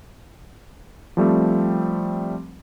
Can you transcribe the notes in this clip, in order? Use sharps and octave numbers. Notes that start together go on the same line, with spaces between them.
F3 G3 A3 C4